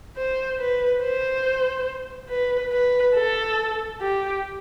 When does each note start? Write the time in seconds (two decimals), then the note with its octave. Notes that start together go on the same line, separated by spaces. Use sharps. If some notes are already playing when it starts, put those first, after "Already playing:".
0.16 C5
0.59 B4
1.01 C5
2.30 B4
2.72 B4
3.15 A4
4.01 G4